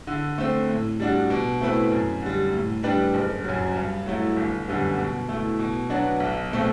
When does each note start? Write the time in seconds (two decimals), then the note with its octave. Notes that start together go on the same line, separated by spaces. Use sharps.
0.07 D3
0.38 A3 C4
0.69 A2
1.00 G3 D4 F#4
1.30 B2
1.61 A3 C4 E4 B4
1.91 F#2
2.22 D3 G3
2.53 A2
2.83 G3 D4 G4 B4
3.14 F#1
3.45 F#2 F#3
3.75 G2
4.06 F#3 A3 E4
4.36 G1
4.67 F#2 D3 G3 B3
4.98 B2
5.29 A3 E4
5.59 B2
5.90 F#3 B3 D4 F#4
6.20 B1
6.51 B2 A3 C4